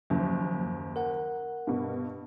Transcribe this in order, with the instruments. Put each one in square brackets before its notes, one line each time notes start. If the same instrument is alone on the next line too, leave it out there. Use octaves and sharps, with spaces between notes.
[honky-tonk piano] F#1 D#2 [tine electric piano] F3 F#3
[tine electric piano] A#4 F#5
[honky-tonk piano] G2 B2